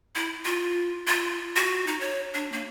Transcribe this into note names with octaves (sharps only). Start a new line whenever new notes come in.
E4
F4
F4
F#4
D#4
C#5
D4
A#3